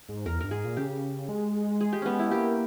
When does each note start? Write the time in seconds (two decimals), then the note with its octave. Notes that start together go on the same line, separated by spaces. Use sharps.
0.09 G#2
0.26 E2 A#4
0.41 G2 A#4
0.51 G#2 G#4
0.65 A#2
0.77 C#3 G4
1.29 G#3
1.81 G#4
1.93 G4
2.02 B3 C#4
2.19 E4
2.31 A#3 G4